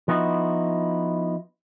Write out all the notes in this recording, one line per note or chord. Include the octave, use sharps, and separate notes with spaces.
F3 B3 D#4 E4 F#4